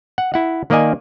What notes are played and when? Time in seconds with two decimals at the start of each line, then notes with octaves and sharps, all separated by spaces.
0.18 F#5
0.34 E4 F#5
0.70 D#3 A#3 D5 D#5 G#5